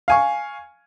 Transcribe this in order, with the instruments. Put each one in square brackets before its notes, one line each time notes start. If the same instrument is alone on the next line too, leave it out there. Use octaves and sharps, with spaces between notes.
[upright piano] F5 G#5 C#6